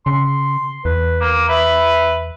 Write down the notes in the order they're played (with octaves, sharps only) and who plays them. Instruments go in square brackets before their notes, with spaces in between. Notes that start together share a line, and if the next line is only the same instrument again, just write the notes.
[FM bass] C#3 [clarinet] C6
[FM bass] E2 [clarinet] B4
[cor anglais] A#3
[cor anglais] B4 [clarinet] E5